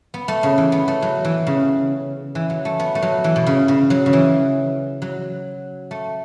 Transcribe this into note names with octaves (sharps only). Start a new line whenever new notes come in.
B3
A3
C#3
E3
B3
A3
F#3
E3
C#3
E3
F#3
A3
B3
A3
F#3
E3
B2
C#3
C#3
F#3
C#3
E3
F#3
A3